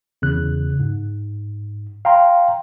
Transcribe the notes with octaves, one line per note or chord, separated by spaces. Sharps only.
E2 C#3 F#6
G#2
F5 G5 A#5 C6